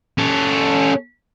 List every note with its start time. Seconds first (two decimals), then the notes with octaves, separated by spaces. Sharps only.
0.18 C#4 A4